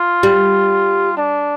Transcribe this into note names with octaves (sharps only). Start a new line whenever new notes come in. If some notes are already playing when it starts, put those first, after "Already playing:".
Already playing: F4
G3
D4